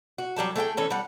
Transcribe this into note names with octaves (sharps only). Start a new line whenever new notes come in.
F#4
F#3 G3 G4 A5
A3 G#4 F5 G5
E3 C#4 A4
G3 F#5